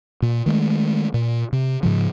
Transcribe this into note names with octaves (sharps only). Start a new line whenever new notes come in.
A#2
D#3 G#3 A3
A#2
C3
G#2 C#3 F3